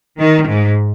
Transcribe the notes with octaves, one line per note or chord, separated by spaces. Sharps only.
D#3
G#2